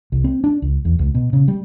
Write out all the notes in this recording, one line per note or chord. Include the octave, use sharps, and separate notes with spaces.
C2
C4
D4
C#2
E2
C#2
B2
C#3
G3